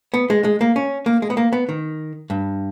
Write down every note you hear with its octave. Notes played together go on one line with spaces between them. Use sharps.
B3
G#3
G#3
A#3
C#4
A#3
G#3
B3
A#3
B3
D#3
G2